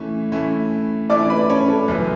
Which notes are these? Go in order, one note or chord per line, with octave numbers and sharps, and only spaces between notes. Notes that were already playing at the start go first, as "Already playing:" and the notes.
Already playing: A2 E3 A3 C#4 E4
A2 E3 A3 C#4 E4
A2 E3 A3 C#4 E4 D5 D6
B4 B5
C#4 C#5
A4
F#1 F#2 E3 B3 B4